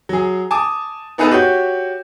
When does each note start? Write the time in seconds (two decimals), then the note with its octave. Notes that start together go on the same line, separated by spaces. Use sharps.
0.09 F#3 G#4
0.51 G#5 A5 D6 D#6
1.18 B3 D#4 G#4 A4 B4
1.31 F#4 G4 C#5 G6